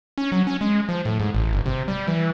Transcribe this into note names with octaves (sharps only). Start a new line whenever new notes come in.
C#4
F#3
C#4
G#3
F3
A2
G#2
A1
G1
C3
G3
E3